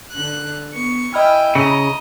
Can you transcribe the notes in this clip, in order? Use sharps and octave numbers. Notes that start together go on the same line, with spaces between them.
D3 F#6
B3 C#6
E4 D#5 G5 G#5 B5 F6
C#3 D#5 A#5 B5